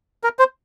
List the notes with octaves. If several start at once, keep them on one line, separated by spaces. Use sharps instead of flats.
A#4
C5